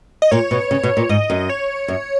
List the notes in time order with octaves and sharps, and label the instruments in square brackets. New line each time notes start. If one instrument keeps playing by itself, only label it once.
[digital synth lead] D#5
[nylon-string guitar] A#2 [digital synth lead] C#5
[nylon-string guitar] B2
C#3
B2
A#2
[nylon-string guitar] G#2 [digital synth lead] D#5
[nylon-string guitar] F#2
[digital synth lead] C#5
[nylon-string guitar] F#2